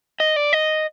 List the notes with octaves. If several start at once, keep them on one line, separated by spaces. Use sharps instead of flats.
D#5
D5
D#5